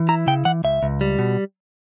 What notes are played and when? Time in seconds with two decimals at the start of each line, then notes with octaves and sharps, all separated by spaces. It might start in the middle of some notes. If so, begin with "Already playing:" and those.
Already playing: E3
0.09 E4 A#5
0.27 C#3 G5
0.45 E3 F#5
0.64 C#2 E5
0.83 C#2
1.01 G3
1.19 B2